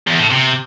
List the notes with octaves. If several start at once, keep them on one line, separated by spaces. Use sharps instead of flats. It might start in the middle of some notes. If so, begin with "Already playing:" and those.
E2
A2
C3